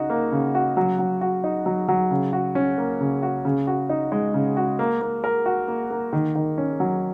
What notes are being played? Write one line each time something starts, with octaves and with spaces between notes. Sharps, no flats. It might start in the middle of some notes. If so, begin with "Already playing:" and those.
Already playing: C#3 D#4 F#4
A#3
C#3
F#4
F#3
F#3
F#4
D#4
F#3
F#3
C#3
F#4
C#4
A#3
C#3
F#4
C#3
F#4
D#4
G#3
C#3
F#4
A#3
A#3
A#4
F#4
A#3
A#3
D#3
D#3
C#4
F#3